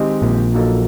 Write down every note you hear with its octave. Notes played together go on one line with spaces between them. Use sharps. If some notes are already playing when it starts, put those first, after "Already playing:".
Already playing: D#3 G#3 C4 D#4 G4
A#1 A#2
F#3 A#3 D#4 F#4 A4